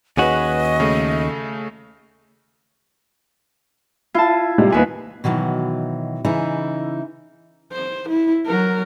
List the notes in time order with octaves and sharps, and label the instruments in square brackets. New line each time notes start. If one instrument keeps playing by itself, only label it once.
[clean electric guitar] D#2 C#4 F#4 [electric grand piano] G#4 B4 [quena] D#5
[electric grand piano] C#3 A3
[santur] E4 [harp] F4 A5
[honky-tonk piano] C3 G3 G#3
[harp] D#2 B4 [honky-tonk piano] B3 G#5
[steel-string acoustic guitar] B2 D#3 E3 F#3
C#3 E3 D#4 E4
[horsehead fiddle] C5
E4
F#3 A#4